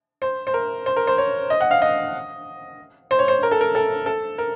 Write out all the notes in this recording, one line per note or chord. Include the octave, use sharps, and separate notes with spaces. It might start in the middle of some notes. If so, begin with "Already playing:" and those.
C5
C5
A#4
C5
A#4
C5
C#5
D#5
F#5
F5
D#5
C5
C#5
C5
A#4
A4
A#4
A4
A4
A#4